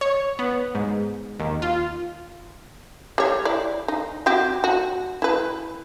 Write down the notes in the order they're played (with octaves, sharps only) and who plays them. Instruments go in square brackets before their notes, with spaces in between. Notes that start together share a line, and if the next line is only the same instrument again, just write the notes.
[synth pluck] C#5
B3
G#2
D#2
F4
[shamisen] G3 C#5
E4 D5
D#4
C4 F#4 G4
F#4
E4 B4